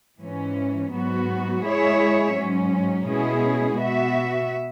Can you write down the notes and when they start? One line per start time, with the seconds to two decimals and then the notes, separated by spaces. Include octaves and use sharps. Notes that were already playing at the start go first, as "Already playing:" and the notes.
0.22 G#2 E3 C#4
0.92 G#2 F#3 B3 F#4
1.64 G#3 E4 G#4 C#5 E5
2.35 G#2 F#3 C#4
3.06 B2 G#3 C#4 E4 G#4
3.77 B2 B3 F#4 E5